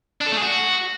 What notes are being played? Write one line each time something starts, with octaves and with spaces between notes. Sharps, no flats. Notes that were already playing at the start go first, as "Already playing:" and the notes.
D4
A4
A3
G#4
F#4